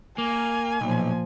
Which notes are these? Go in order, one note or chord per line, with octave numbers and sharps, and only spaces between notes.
A#3 G#5
B1 A#2 F3